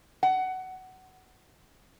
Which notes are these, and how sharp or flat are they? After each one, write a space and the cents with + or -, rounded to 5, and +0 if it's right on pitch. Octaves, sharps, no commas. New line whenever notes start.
F#5 +15